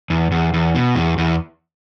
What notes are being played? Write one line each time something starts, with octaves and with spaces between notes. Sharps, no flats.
E2
E2
E2
B2
E2
E2